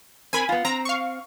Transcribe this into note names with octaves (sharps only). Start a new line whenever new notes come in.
C4 A#4 G#5 B5
B3 F4
C4 A#5
F5 C#6